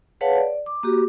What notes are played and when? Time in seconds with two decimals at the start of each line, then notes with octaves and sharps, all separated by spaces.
0.21 G#4 B4 C#5 F5 F#5 A5
0.36 D5
0.66 D6
0.83 A#3 F#4 G4 D6